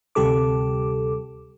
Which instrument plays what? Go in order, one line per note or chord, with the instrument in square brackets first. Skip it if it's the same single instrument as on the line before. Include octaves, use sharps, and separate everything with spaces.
[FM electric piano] D2 C3 G3 G4 A4 D6